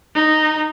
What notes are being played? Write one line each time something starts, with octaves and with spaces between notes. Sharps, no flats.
D#4